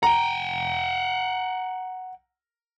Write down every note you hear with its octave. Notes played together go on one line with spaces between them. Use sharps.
F#5 G5 A#5